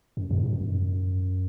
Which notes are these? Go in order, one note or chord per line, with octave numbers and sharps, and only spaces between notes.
F#2
B2
A2
G#2
F#2